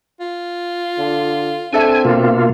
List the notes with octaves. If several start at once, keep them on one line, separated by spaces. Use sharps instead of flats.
F4
D3
C4 D4 A4 E5 G#5
B2 A#3 F4